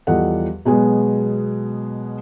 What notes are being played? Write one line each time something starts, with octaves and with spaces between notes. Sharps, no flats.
E2 F3 G3 A4 D#5 F#5
B2 F#3 G#3 B3 G#4 G#5